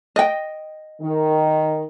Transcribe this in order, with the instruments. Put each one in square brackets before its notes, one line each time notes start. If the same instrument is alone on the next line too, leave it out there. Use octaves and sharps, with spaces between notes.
[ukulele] D#5 G5
[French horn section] D#3